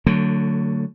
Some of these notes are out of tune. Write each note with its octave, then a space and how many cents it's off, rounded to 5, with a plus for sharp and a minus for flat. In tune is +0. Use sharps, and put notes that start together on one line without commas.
D3 +0 F#3 +0 A3 +35